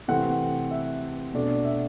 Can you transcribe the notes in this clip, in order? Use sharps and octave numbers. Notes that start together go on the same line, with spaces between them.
C3 E3 A3 C4 F#5
E5
B2 A3 D4
E5